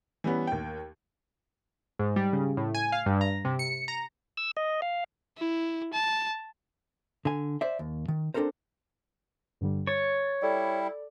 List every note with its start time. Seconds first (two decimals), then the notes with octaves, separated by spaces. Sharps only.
0.24 E3 G3 B3 C#4
0.47 D#2 G5
1.99 G#2
2.16 G3
2.33 C#3
2.57 A2
2.75 G#5
2.92 F5
3.06 G2
3.21 A#5
3.45 C3
3.59 C#7
3.88 A#5
4.37 E6
4.57 D#5
4.82 F5
5.38 E4
5.93 A5
7.25 D3 G#5
7.61 C5 D5 E5
7.79 D#2
8.08 D#3
8.34 C4 D4 D#4 A4 A#4 C5
9.61 G2 D3 G3
9.87 C#5 A6
10.42 G3 E4 A4 D5